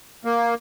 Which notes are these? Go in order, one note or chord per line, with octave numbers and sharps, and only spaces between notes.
A#3